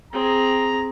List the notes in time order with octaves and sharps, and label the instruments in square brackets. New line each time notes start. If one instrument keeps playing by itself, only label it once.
[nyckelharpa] C4 G#4 [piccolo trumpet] A#5